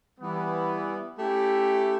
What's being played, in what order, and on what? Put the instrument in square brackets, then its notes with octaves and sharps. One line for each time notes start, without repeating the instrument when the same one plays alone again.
[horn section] E3 G3 B3
A3 C#4 E4 G4